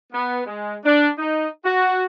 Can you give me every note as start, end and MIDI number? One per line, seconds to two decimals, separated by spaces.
0.12 0.42 59
0.46 0.75 56
0.85 1.09 62
1.18 1.46 63
1.64 2.04 66